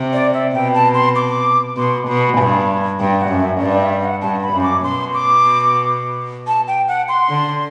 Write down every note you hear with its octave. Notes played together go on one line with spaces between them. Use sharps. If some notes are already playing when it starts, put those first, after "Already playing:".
Already playing: C3
D5
E5
B2 G5
A5
C6
D6
B2 C6
B2 B5
G2
G2 G5
F#5
F#2
E5
G2 D5
E5
F#5
G2 A5
B5
F#2
D6
B2 C6
D6
A5
G5
F#5
C6
D3